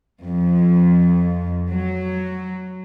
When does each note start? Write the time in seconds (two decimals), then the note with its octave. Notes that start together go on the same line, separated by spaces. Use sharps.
0.24 F2
1.71 F#3